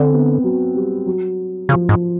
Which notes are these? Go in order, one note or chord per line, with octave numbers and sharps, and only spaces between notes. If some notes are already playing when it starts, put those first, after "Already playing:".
Already playing: D3 C4
B3
F#3
G3
F#3
C#3 F3
G#2